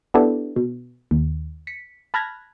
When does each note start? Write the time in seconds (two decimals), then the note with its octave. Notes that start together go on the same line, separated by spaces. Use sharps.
0.14 B3 D4 E4 G4 A4
0.56 B2
1.11 D#2
1.67 B6 C#7
2.14 A5 B5 F6 F#6 G#6 A#6